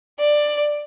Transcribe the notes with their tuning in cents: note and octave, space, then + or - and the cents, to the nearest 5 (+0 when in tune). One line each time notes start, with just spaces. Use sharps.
D5 +15